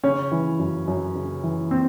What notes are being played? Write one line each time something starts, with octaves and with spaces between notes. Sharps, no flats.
C#3 C#4
E3
F#2
F#2
C#3
E3
C4